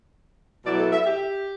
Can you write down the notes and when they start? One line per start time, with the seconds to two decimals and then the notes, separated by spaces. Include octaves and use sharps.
0.64 B2 F#3 A3 E4 D5
0.79 A4
0.93 E5
1.06 G4